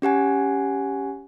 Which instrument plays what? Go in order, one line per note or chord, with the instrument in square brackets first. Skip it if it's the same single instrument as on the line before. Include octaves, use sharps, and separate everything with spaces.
[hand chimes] C#4 G4 F#5 G#5